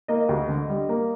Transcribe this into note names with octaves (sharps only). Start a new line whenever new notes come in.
A#3 D#5
D2
D3
G3
A#3